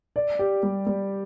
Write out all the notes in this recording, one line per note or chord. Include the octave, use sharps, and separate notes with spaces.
D5
G4
G3
G3